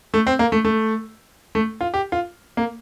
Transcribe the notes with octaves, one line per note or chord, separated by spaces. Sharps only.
A3
C4
A#3
A3
A3
A3
F4
G4
F4
A#3